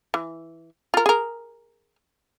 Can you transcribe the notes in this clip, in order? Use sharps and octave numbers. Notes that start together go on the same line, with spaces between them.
E3
F4 A#4
G#4 A#4